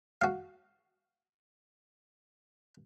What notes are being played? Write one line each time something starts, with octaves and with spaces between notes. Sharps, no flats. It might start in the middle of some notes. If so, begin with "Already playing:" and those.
F#4 F5